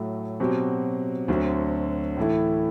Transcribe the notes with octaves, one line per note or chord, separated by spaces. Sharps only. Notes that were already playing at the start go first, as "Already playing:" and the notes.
Already playing: A2 F#3 A3
B2 F#3 C4 G4
D2 D3 F#3 C4 F#4
A2 E3 A3 E4